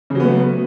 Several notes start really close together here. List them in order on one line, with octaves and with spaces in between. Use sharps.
C#3 F#3 B3 A3